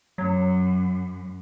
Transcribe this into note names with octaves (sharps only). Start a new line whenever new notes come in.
F#2 F#3